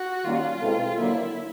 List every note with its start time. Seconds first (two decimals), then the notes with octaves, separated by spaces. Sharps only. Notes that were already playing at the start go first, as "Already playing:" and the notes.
Already playing: F#4
0.24 D#3 G3 A#3 C#4 F4
0.61 B2 G#3 C4 E4 A4
0.98 D3 F#3 A#3 E4